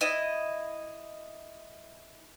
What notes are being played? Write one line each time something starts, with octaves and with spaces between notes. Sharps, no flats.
E4 D#5